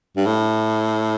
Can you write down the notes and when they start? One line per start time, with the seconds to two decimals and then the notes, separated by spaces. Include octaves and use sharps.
0.17 G2
0.26 A2